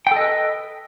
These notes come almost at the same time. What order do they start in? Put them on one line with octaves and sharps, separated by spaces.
G5 A4 D#5 B4